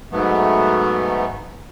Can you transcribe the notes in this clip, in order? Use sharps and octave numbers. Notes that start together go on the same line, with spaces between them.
G#2 F#3 A3 B3